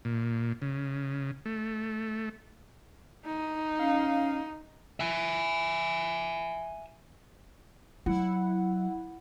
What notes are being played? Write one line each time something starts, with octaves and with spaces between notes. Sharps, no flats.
A#2
C#3
A3
D#4
C#4 F5
E5 G#5
F#3 E4 F#5